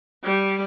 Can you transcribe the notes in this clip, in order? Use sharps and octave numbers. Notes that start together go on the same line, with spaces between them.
G3